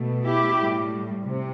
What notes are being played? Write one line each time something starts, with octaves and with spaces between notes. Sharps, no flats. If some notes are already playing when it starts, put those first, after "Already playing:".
Already playing: B2 A3
E4 G4
A2 G3
C3